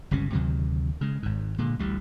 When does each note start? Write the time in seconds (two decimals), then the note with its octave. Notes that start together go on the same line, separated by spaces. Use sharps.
0.11 G1 C#2 C3 C#4
0.33 D2 C3 D#3 F#3
1.01 C#3 G#3
1.23 G#1 G#2
1.58 A#2 D3 G#3
1.79 A1 D2 G3